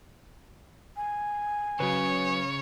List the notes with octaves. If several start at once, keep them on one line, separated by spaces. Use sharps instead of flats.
G#5
C#3 F#3 B4 C#5